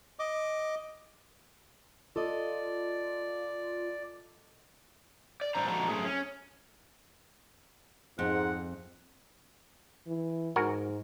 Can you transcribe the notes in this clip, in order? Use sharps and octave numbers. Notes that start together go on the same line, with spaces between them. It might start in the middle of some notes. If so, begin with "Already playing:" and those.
D#5 D6
F4 A4 D5 D#5
D5
G2 D4 C5 A#5
D3 F3 G#3 F#4 A5 A#5
F#2 E3 A3 G#4
C#4
F2 G#2 F#5
E3
G#2 F#4 A#4 G#5